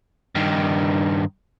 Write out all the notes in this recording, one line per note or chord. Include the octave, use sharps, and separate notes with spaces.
G2 D#3